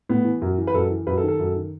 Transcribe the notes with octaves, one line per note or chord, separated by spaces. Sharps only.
A2 B3
E3
F#2
E3
B4
F#2 A4
E3
F#2 B4
A4
D#3
A4
F#2
D#3